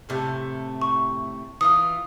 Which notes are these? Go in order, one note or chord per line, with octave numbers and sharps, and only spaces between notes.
A2 C3 A3
C#6
E3 F4 D#6